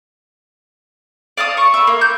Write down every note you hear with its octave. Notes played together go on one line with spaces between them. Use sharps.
D5 F5 A5 D#6
C#6
E5 B5
A#3
G6